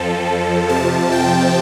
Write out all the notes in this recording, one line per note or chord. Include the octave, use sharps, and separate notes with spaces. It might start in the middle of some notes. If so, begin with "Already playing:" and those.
Already playing: F2 F3 A4
F2 C3 F3 A5
G5